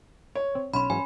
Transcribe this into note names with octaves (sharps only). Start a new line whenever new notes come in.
C#5
C4
B1 C#4 B5 C6
G#2 E3 F#3 G#5